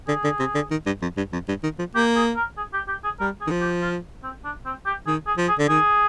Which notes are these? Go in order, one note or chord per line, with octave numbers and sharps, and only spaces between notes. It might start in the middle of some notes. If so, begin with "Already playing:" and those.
D3 G#4
D3
C3
D3
D#3
G2
F2
G2
F2
G2
D#3
F3
A#3 G4
G#4
A#4
G#4
G4
G4
G#4
G3 A#4
G#4
D#3
F3
G4
F4
C4
D4
C4
G4
D#3 G#4
G#4
F3
G#4
D3
D#3 G#4